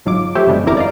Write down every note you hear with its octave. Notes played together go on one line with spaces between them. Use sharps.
G1 G#2 F#3 F4 D6
F3 A3 G4 C5 C#5 E5
F#2 B2 D3 G3 G#3
G1 E2 C4 E4 A#4 D6
D5 D#5 F5